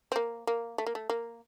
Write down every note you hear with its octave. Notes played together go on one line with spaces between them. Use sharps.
C4
A#3
A#3
A3
A#3
A3
A#3